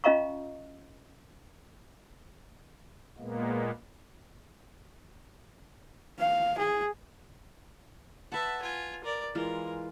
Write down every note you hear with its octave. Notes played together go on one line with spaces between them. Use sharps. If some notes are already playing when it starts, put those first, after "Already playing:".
C#4 F4 D#5 F5 A#5 C#6
A#2 G#3 A#3 B3
F5
G#4
B4 E5 F#5 A5
F4 G#5
A#4 D5
E3 G#3 F4 A#4